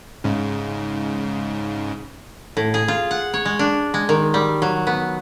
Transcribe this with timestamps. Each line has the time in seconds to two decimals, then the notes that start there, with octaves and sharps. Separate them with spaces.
0.24 G#2 C#3
2.57 A2
2.74 G#4
2.88 F4
3.11 F#5
3.34 C#5
3.45 G#3
3.59 D4
3.94 G#3
4.09 D#3
4.34 G3
4.62 F#3
4.87 B3